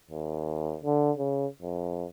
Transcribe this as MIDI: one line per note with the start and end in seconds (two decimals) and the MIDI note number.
0.10 0.77 39
0.84 1.11 50
1.18 1.46 49
1.62 2.05 41